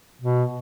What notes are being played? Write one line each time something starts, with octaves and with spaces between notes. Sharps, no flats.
B2